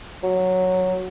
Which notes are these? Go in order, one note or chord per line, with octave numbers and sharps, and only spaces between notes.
F#3